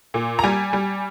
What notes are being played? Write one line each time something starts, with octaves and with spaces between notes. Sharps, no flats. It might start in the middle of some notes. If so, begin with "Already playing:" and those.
A#2
A#5
G3 G#5
G3